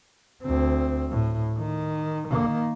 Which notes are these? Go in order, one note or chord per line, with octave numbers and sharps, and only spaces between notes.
D2 C4
A2
D#3
D#3 A#3